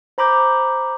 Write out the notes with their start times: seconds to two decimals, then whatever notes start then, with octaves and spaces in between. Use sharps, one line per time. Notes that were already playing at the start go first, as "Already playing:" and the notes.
0.18 C5 A#5 B5 D6 G6